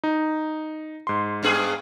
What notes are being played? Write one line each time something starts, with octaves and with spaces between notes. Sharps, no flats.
D#4
G#2 C6
G2 B3 G#4